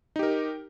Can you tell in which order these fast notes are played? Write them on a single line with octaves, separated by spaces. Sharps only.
D#4 G4 A#4